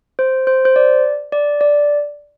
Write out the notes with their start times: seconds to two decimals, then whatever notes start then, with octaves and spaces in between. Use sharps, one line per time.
0.19 C5
0.47 C5
0.65 C5
0.76 D5
1.32 D5
1.61 D5